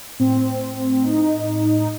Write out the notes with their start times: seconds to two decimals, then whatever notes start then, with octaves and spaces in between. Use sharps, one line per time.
0.19 A2 C4
1.03 A2 D#4
1.80 D#4